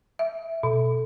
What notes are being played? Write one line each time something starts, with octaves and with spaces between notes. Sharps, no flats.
E5
B2